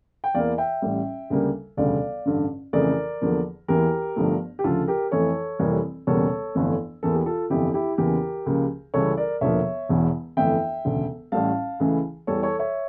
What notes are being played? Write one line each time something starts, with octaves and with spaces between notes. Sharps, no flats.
G5
E2 E3 A#3 D5 F5
E5 G5
A1 A2 G3
D2 C#3 G3 A#3
E1 D2 C#3 G3 D5 F5
A1 G2 D3
F2 C#3 E3 A3 A#4 D5
E2 D3 F3 A#3
E2 E3 A#3 G4 A#4
G1 G2 F3 A3
G4
D2 C#3 F3 F4 A4
G4 A#4
F2 E3 A3 A4 C#5
F1 F2 E3 G3 A#3
E1 E2 C#3 G3 A#3 A4 C#5
G1 F2 E3 A3
E2 E3 A#3 A4
G4
F4 A4
G1 F2 E3 E4 G4
E4 G4
E2 C#3 E3 A#3 G4 A#4
C#2 C#3 F3 A#3
C#2 C#3 E3 G3 A4 C#5
A#4 D5
E1 E2 D3 F3 A#3 C#5 E5
E1 E2 E3
G1 F2 E3 A3 E5 G5
E1 D2 C#3
A1 A2 G3 F5 A5
C#2 C#3 E3 A3
E2 E3 G3 A4 C#5
A4 C#5
C#5 E5